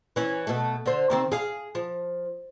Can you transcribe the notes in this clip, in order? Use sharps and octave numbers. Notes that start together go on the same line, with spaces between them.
E3 C#4
B2 A3
D3 C5
C3 D#3 C4
G#4 F5
F3